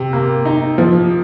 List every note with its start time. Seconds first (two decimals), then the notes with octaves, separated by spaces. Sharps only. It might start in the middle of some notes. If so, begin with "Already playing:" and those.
Already playing: C3
0.13 A#3
0.45 D#4
0.78 F3